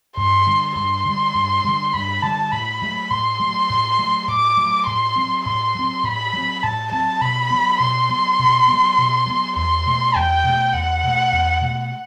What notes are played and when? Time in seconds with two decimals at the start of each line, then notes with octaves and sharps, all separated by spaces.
0.17 G2 C6
0.47 D3 G3
0.76 G2 C6
1.05 D3 G3
1.35 G2
1.64 D3 G3
1.94 G2 B5
2.22 D3 G3 A5
2.52 A2 B5
2.82 F#3 A3
3.10 A2 C6
3.40 F#3 A3
3.70 A2
3.99 F#3 A3
4.28 A2 D6
4.57 F#3 A3
4.87 A2 C6
5.16 F#3 C4
5.46 A2 C6
5.75 F#3 C4
6.04 A2 B5
6.33 F#3 C4
6.63 A2 A5
6.92 F#3 C4 A5
7.21 B2 B5
7.50 F#3 B3
7.80 B2 C6
8.09 F#3 B3
8.39 B2
8.68 F#3 B3
8.98 B2
9.27 F#3 B3
9.56 E2 C6
9.86 B2 A3
10.15 E2 G5
10.44 B2 A3
10.73 E2 F#5
11.04 B2 A3
11.32 E2
11.61 B2 A3